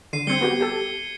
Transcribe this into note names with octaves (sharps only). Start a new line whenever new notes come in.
D3 C7 D#7
G3 C4 G#6 C#7 G7
B3 F#4 G4
G4 A4